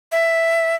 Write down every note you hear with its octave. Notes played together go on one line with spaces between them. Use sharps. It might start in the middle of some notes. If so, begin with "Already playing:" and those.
E5